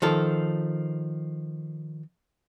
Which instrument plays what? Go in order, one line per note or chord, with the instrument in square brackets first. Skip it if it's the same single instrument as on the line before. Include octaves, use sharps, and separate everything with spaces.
[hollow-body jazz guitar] D#3 F3 A4